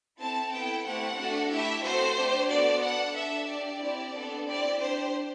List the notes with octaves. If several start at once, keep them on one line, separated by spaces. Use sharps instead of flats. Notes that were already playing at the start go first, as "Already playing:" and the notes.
C4 E4 A4 A5
B3 E4 A4 G5
A3 C4 E4 G4 F#5
A3 D4 F#4 A4
A3 E4 G4 E5
A3 C4 F#4 A4 C5
A3 D4 G4
B3 F#4 A4 D5
D4 A4 F#5
D4 A4 E5
D4 G4 D5
C4 E4 G4
B3 D4 A4
C4 E4 G4 D5
D4 G4 C5